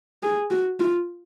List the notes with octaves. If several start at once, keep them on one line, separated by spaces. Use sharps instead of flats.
G#4
F#4
F4